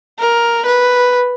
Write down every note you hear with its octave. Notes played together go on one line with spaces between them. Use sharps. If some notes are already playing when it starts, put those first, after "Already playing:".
A#4
B4